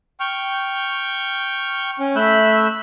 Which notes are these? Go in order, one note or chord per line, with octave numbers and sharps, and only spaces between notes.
G5 C#6 F6
C#4
A3 E5 B5 E6 F#6 G6